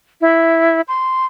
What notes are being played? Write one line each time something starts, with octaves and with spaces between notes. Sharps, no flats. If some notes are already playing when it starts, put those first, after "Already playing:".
E4
C6